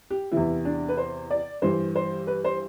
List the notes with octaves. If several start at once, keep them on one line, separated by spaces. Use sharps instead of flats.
G4
E2 C3 E3 E4
D4
B4
C5
D5
G2 E3 C5
C5
B4
C5